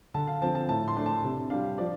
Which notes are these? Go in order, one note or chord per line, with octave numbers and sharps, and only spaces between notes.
D3 A5
F5
F3 C4 A5
A5
A2 A5
C6
A3 D4
A5
C3
G3 D4 F5
F3 D5